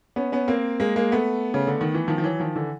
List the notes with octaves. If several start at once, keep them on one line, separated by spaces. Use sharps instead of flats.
B3 C#4
B3 C#4
A#3 C4
G#3 A#3
G#3 A#3
A3 B3
C#3
D3
D#3
E3
D#3 F3
F3
E3 F#3
D#3 F3
D3 E3